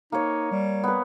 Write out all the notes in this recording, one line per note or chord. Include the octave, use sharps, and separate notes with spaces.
A#3 D#4 C#5
G3
B3 B4